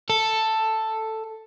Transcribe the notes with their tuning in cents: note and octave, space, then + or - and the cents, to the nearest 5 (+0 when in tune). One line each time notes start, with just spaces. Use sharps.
A4 +5